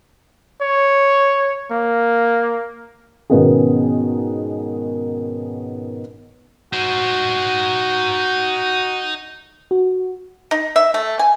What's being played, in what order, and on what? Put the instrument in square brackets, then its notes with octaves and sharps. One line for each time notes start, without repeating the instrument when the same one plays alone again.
[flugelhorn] C#5
A#3
[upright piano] G#2 B2 D#3 B3 C#4 G#4
[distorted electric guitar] D#4 C5 [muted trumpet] F#4
[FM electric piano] F#4
[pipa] D#4
E5
A3
G#5